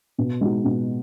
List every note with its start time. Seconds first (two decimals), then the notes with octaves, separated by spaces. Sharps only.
0.18 B2
0.41 G#3 D#4 F#4
0.65 B2